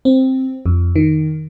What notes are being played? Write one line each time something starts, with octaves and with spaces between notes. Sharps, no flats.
C4
F2
D#3